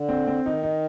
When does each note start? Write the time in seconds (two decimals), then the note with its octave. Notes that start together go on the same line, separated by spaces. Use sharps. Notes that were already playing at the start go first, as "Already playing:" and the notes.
Already playing: D3
0.09 C4
0.27 C4
0.45 D#3 D#4
0.63 D#4